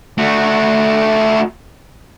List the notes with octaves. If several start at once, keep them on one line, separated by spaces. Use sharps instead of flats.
A3 F#4